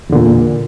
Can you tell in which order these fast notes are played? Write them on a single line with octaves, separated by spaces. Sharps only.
E2 D3 A#2